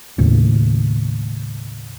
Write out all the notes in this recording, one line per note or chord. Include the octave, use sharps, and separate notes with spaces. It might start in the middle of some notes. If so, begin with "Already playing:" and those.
D#2 A2 C#3